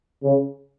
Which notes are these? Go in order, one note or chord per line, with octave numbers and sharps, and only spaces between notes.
C#3